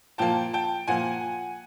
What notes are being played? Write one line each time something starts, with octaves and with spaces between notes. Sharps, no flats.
A#2 F3 A#3 G5 A5
G5 A5
A#2 F3 A#3 F#5 G#5